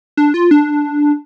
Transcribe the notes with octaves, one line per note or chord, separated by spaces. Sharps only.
D4
F4
D4